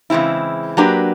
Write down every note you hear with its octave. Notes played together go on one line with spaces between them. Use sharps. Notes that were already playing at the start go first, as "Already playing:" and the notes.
C#3 E3 G#3 C4 E4
F#3 A#3 D4 G4 B4